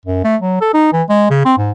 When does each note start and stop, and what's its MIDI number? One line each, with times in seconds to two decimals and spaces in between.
0.05 0.21 42
0.24 0.36 57
0.42 0.61 54
0.61 0.72 69
0.74 0.88 63
0.93 1.03 52
1.09 1.26 56
1.30 1.44 49
1.45 1.53 60
1.58 1.71 44